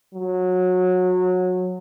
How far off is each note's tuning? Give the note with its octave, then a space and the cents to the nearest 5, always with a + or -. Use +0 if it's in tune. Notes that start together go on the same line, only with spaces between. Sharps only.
F#3 -20